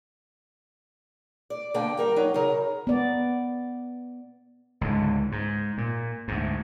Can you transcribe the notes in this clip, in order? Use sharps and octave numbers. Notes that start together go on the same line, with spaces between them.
D5
B2 D3 A#3 D5 G5
G3 A#4 G5
F#3 D#4
C#3 A#4
B3 D5
C#2 G#2 D3
G#2
A#2
D2 G#2